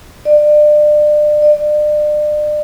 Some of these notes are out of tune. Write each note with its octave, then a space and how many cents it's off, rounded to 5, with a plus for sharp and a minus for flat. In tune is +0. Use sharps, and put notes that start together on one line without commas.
D5 +30
D5 +35